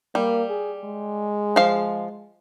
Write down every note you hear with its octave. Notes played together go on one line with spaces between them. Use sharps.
G3 A#3
G#4
G#3
F3 F5